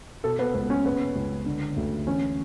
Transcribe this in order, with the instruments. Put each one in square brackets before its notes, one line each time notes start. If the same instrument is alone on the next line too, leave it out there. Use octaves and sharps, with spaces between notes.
[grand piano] B2 A4
B3
C#2 B3
C#4
C#3 B3
C#2
D3
D2
E3 C#4